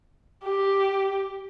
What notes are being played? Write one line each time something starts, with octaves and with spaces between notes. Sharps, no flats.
G4